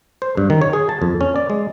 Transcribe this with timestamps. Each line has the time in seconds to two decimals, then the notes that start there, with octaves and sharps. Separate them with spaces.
0.22 C5
0.37 G2
0.50 D#3
0.61 C#5
0.73 G#4
0.89 A5
1.02 F2
1.21 C#4
1.36 D5
1.50 G#3